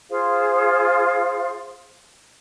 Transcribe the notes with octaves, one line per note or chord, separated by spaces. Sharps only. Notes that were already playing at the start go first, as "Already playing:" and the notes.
F4 G#4 C5 F5